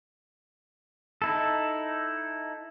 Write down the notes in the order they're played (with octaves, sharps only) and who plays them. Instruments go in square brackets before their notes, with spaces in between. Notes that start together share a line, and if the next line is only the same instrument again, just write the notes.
[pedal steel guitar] D#4 E4 A4